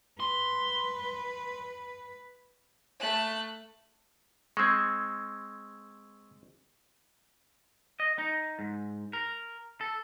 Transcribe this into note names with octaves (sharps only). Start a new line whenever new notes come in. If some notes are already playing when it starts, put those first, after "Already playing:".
B4 C6
A3 F#6
G#3 C4 C#6 E6 G#6
D#5
D#4
G#2
A#4
A4